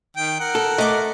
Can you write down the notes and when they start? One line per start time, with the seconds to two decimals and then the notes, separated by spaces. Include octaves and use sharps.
0.17 D#3 G5
0.40 A#4 F#5
0.55 A4
0.78 A3 D#5 D6